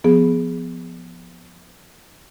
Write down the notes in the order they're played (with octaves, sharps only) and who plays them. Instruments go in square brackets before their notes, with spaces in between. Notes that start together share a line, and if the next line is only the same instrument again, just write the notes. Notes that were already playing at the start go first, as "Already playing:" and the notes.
[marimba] F3 B3 G#4